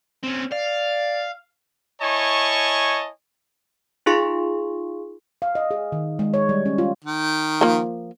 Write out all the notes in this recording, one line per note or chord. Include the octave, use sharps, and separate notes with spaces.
C4 C#4
D5 F5
E4 C#5 D#5 G#5 A5 C#6
D#4 F4 G#4 F5 C6 C#6
F5
D#5
G#4
D#3
G#3
C#5
G3
C#4
F4
D#3
F3 A#3